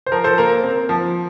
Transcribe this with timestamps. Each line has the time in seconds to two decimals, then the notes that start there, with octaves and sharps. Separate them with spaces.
0.06 C5
0.12 F3 A#4
0.24 A4 C5
0.38 A#3 A#4
0.64 C4
0.89 F3